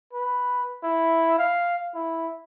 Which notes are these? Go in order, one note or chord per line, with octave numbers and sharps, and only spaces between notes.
B4
E4
F5
E4